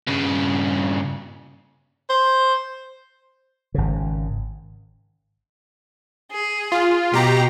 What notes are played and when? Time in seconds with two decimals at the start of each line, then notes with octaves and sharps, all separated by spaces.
0.08 G2 C#3
2.10 C5
3.74 G#1 C#3
6.31 G#4
6.72 F4
7.14 B2 G4 A#5